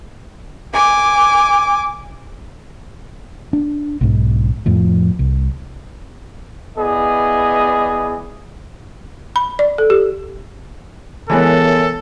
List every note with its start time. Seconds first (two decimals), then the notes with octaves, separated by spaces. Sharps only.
0.73 G#5 D6
3.53 D4
4.01 B1 G#2
4.66 F2 A2 F3
5.19 C2
6.77 B3 E4 G#4 D5 D#5
9.36 B5
9.59 D5
9.78 A4
9.90 G4
11.30 E3 G#3 B3 A4 A#4 C#5 E5